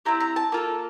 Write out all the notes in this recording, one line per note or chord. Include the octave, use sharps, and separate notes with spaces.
C4 E4 G4 A#5
A#5
A5
A#3 F4 A4